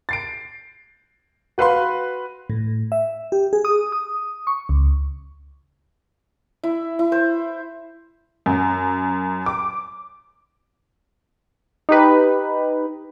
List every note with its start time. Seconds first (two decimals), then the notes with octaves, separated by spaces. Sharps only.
0.09 A6 C7 D7
1.58 F#4 B4 F5 B5 C6
2.50 A2
2.92 E5
3.32 G4
3.53 G#4
3.65 D#6
3.92 D#6
4.47 C#6
4.69 C#2
6.63 E4
6.99 E4
7.12 C5
8.46 F#2
9.46 D6
11.89 D#4 G4 B4